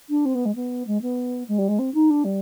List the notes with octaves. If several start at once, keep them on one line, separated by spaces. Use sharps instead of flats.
D4
C4
B3
G#3
B3
G#3
B3
G#3
G3
G#3
C4
D#4
D4
G3